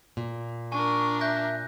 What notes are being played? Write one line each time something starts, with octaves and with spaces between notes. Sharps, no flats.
A#2
D4 A#4 G#5 C#6
E5 F#6 G6 A#6